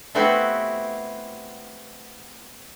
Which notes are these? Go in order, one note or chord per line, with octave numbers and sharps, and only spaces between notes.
A3 B3 C4 E4 F#4 G4